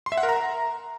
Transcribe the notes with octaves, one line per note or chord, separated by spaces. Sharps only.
C6
E5
F#5
A#4
A#5